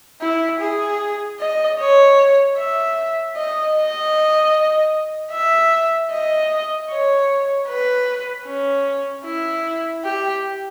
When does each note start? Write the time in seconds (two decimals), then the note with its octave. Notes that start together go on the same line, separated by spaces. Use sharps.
0.22 E4
0.60 G#4
1.40 D#5
1.79 C#5
2.57 E5
3.37 D#5
3.76 D#5
5.32 E5
6.11 D#5
6.90 C#5
7.68 B4
8.46 C#4
9.25 E4
10.04 G4